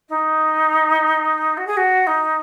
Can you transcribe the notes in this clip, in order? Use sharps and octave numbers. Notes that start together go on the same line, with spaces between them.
D#4
F#4
G#4
F#4
D#4